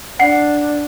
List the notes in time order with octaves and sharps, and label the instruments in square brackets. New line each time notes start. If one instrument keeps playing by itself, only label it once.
[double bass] D4 [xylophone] F#5 C7